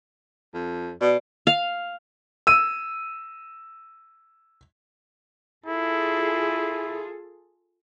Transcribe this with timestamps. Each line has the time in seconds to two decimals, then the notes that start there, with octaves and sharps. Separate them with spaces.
0.54 F2
1.01 B2 D5
1.47 F5
2.47 E6 D#7
5.66 E4 F4 G#4 A4